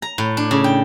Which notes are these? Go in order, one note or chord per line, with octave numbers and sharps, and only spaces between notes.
A#5
A2
D4
C#3
G5